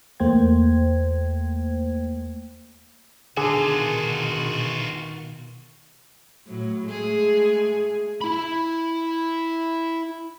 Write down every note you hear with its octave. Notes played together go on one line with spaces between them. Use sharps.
E2 A3 A#3 C5 G5 G#6
B2 D3 D#3 F4 F#4 G#4 G#5
A2 F#3
G#3 A3 G#4
E4 B5